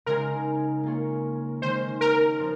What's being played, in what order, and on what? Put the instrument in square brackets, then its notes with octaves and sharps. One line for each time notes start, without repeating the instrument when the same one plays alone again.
[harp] C#3 G#3 C4 D#4 G#4 [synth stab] A#4
[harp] A#3 F4 G#4 C#5
[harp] D#3 G#3 C#4 [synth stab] C5
[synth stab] A#4
[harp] F3 C4 F4 C5